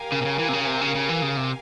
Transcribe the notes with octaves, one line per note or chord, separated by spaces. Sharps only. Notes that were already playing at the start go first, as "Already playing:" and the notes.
Already playing: G4 A#4 F5 G#5
C#3
C3
C#3
E3
C3
C#3
C3
C#3
C#3
E3
C#3
C3